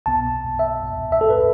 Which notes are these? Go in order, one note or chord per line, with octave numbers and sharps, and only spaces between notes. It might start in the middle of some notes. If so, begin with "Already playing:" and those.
B1 B2 B3 A5
E5
E5
A4
B4